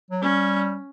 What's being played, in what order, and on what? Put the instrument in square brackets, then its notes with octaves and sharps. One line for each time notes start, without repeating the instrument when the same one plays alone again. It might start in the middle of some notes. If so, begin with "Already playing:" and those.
[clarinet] F#3
[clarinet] G3 [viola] C#4